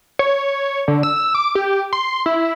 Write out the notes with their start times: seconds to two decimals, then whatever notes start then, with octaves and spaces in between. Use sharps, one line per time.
0.19 C#5
0.88 D3
1.03 E6
1.35 D6
1.55 G4
1.93 C6
2.26 E4